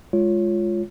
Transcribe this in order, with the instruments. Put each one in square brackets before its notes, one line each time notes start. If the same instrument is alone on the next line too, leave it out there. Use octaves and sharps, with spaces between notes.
[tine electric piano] G#3 F4 C#5